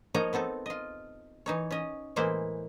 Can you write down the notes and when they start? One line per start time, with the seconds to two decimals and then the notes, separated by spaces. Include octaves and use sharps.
0.14 F3 A#3 D#4 C#5 D#5 A#5
0.33 B3 C4 D#4 A4
0.66 F4 D#5
1.46 E3 D#4 C#5
1.71 C#4 D#5
2.16 A2 E3 G#3 A#3 E4 C5